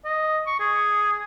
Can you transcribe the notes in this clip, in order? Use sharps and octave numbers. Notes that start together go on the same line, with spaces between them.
D#5
C#6
G#4